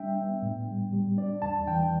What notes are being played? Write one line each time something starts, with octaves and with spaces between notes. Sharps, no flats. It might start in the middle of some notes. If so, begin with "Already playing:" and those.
Already playing: G3 D4 E5 G5
B3
A2
G3
G3
D4 D5
E2 A5
E3 G5